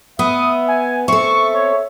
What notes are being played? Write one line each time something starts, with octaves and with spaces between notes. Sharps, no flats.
B3 E5 D#6
G#5
C4 A4 E5 C#6
C#5